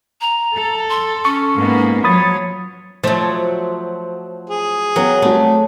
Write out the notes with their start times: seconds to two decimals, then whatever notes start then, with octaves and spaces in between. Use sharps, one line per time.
0.21 A#5
0.54 A4
0.89 C6
1.25 C#4 C#6
1.56 G#2 A#3 B3
2.04 F3 F#3 C#5 B5 D#6 A6
3.04 F3 F#3 A3 C5 A6 E7
4.50 G#4
4.96 F#3 B3 A#4 G5
5.22 G3 A3 C4 F#4